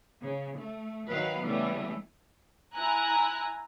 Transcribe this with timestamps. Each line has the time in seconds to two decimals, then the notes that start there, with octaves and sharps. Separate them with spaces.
0.24 C#3
0.57 A3
1.09 D#3 F#3 B4 F5
1.46 C#3 E3 G3 A3 B3
2.76 E4 G#5 A#5 F#6